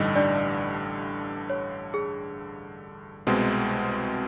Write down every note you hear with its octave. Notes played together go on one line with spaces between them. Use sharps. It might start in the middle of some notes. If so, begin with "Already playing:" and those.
Already playing: A1 G2 D3 G3 D#4 D#5
D4 D5
C#5
G#4
C2 B2 G#3 C4